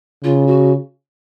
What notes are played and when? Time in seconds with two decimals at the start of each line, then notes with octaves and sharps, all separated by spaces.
0.24 C#3 F4
0.47 F#4